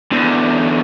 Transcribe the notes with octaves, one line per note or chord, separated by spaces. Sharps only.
E2 D3